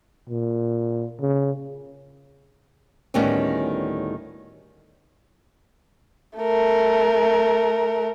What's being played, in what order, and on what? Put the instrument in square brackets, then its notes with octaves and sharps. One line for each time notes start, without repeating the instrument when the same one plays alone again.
[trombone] A#2
C#3
[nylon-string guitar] D2 A2 D#3 G3 B3 C#4
[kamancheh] A3 A#4